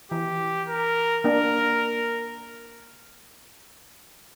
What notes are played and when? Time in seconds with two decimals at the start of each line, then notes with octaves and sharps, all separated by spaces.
0.11 E3 G4
0.68 A#4
1.24 A#3 D4 A#4